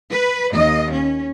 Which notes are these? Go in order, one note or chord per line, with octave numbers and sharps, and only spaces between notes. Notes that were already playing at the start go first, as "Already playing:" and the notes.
B4
D#2 D#5
C#4